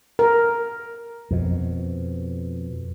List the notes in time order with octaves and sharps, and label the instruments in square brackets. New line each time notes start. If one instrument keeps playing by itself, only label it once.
[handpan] A#4
[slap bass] F2 B2